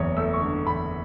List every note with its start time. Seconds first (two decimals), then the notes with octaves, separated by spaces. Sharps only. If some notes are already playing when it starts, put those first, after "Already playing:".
Already playing: F#1 E2 C#5
0.17 A3 E6
0.33 C#6
0.41 D3
0.66 E2 B5